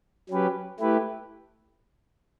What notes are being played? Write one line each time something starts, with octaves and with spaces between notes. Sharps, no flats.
F#3 C#4 G4 B4
A3 E4 G4 B4